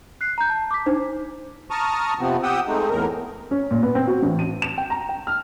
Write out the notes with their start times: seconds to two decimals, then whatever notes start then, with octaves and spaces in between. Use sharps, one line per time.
0.21 F#6 C7
0.38 A#5 G6
0.49 A5
0.71 D6 B6
0.86 D4 D#4 C5
1.71 A5 A#5 C#6 D#6 F6
2.19 C3 F3 B3 C4
2.43 G4 F#5 G5 D#6 E6
2.67 G#3 A3 C4 D#4
2.90 E2 A2 A#4
3.51 C#4
3.71 A#2
3.83 B3
3.95 C4
4.07 F#4
4.22 A1
4.39 D#7
4.62 E7
4.78 G5
4.90 A#5
5.09 G5
5.27 F6